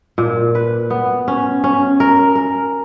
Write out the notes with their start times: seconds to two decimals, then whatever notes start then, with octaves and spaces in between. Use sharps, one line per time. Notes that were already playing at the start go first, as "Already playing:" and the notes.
0.18 A#2
0.55 B4
0.90 B3
1.28 C#4
1.64 C#4
2.00 A#4
2.35 A#4